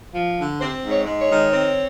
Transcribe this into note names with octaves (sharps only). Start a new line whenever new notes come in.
F3
D3
C4 C5
G#2
C#5
G#3
C#5
D#3
C4